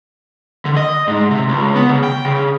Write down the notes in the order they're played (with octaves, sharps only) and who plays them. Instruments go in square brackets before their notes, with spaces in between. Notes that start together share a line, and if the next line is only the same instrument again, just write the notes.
[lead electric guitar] D3
D#5
G#2
C3
C#2
B3
C#3
G5
C#3